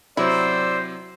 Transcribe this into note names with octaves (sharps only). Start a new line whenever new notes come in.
C3 F#3 C4 E4 C5 D5 E6